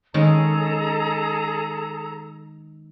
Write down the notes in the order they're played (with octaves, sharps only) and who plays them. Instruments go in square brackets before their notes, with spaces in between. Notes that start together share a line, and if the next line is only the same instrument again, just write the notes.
[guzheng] D#3 G#3 C#4 [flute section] G#4 A4 A#5